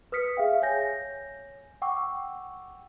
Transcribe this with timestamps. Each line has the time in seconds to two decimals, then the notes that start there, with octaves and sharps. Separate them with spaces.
0.12 B4 D#6 F6 B6 C#7
0.37 G#4 E5 F5 G5
0.62 C#5 G#5 G6 A#6
1.82 F#5 G5 C#6 D6 E6